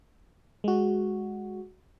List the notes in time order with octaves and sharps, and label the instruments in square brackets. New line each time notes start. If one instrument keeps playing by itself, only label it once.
[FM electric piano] G#3 F#4